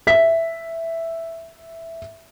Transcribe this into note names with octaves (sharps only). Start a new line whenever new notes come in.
E5 B6